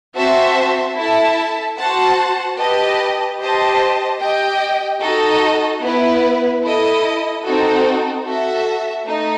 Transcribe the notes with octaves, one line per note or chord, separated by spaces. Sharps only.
C4 F#4 C5 E5 A5
E4 A4 E5 A5
F#4 C5 F#5 A5
G4 B4 D#5 A5
G4 C5 D#5 A5
G4 D#5 G5
D#4 F#4 A4 D#5
B3 E4 B4
E4 A4 D#5
C4 D#4 F#4 A4
F#4 A4 E5
A3 D#4